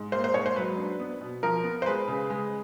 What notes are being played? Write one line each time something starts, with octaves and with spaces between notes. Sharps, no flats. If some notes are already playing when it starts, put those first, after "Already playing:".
Already playing: G#2
A#3 C5
C5
G#2 C#5
C5
F#3 B4
D4
B3
B2
F3 A#4
B3
C5
G#3 B4
C#3
G#3